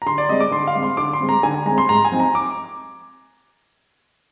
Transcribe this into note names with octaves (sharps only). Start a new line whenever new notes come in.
A#5
D3 C6
D5
G#3 C4 D#5
D6
D3 C6
F5
G#3 C4
C6
D3 D6
C6
G#3 C4
A#5
D3 G#5
G#5
G#3 C4 A#5
C6
G#2 A#5
G#5
F3 C4 D#4
A#5
D6